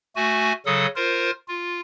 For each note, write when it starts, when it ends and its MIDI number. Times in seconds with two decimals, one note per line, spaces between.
0.16 0.53 57
0.16 0.53 66
0.16 0.53 80
0.66 0.87 49
0.66 0.87 54
0.66 0.87 69
0.66 0.87 87
0.96 1.31 65
0.96 1.31 70
0.96 1.31 72
1.48 1.81 65